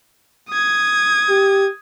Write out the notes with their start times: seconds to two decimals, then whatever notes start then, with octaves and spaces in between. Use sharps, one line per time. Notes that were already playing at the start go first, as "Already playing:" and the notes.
0.50 D#6 G#6
1.29 G4